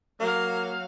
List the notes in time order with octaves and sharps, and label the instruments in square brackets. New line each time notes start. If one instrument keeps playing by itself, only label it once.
[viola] F#3 F5 [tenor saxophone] A#3